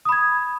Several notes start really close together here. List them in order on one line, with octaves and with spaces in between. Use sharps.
D#6 B5 G#6